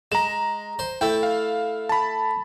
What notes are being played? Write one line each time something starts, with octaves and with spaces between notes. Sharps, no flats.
G#3 A#5 E7
C5
A3 E4 G5
F5
A5 B5